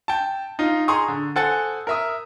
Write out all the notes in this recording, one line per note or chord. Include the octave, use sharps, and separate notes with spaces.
G5 A5
D#4 F4
G#4 A#5 C6 C#6 D#6
D3
A4 C5 F#5 G#5 A6
A#4 E5 D#6